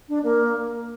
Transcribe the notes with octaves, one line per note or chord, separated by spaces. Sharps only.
D4
A#3